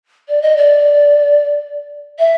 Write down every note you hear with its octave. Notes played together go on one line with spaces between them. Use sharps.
D5
D#5
D5
E5